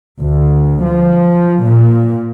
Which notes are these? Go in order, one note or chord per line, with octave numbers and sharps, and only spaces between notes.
D2
F3
A#2